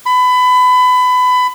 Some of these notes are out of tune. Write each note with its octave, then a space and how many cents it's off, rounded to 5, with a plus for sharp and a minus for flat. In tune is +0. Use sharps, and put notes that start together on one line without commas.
B5 +25